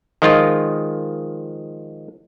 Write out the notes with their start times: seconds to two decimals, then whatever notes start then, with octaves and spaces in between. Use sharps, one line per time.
0.22 D#3 F3 G#3 F4